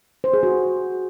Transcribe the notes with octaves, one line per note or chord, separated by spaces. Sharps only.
C5
G#4
F#4